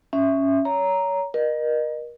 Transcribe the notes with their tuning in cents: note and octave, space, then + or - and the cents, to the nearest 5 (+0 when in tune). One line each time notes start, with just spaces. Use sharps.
C#4 +0 E5 +0
C#5 +25 A#5 +0
A#4 +30 D#5 -25